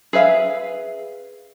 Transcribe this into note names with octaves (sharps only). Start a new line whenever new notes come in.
G#4 B4 E5 F5